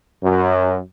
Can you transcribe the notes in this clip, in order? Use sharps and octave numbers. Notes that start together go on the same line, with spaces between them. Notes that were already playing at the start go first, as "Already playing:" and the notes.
F#2